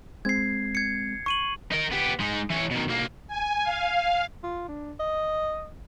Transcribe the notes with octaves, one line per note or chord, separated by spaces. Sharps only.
G#3 C4 G#6 C7
G#6 C#7
C#6 D#7 F#7
D#4 A#4
B3 G4
G#3 D#4
E3 C#5
B2 D#3
B1 A#3
G#5
F5
F4
D4
D#5